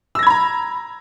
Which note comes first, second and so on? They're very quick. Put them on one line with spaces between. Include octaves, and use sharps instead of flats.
E6 A#6 G#6 B5 A#5